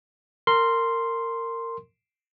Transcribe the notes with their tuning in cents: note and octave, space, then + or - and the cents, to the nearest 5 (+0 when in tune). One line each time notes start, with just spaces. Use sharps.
A#4 -25 C6 +0